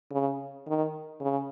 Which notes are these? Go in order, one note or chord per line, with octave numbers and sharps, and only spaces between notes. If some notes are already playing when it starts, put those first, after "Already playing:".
C#3
D#3
C#3